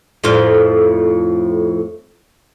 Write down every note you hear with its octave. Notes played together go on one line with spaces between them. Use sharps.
F2 A2 F4